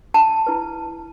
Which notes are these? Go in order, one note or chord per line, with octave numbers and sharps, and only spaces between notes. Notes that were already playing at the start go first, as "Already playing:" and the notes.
A5
E4 B4